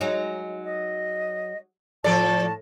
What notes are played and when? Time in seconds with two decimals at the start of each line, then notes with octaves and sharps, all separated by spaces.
0.01 F#3 G#3 D#4
0.64 D#5
2.04 A2 F3 A4 D5 A5